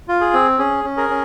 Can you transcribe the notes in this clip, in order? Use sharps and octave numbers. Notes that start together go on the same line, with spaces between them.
F4
G#4
C4
C#4 G#4
C#4
G#4 A#4
C#4